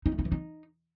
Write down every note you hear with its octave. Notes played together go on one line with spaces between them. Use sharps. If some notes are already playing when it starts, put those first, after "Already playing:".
D#4
A3
D#4
E3
D#4